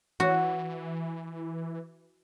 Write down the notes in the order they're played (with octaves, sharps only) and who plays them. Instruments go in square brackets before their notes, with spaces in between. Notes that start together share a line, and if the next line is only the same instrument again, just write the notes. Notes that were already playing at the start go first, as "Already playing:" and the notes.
[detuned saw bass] E3 [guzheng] F#4